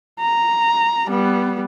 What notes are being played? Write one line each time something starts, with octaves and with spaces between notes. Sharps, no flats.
A#5
G3 B3